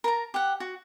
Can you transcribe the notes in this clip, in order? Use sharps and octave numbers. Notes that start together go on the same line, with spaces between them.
A#4 A5 A#5
G4 F#5
F#4